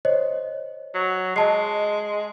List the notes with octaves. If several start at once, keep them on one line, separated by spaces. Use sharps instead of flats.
C5 C#5 D#5
F#3
G#3 D#5 A5 C7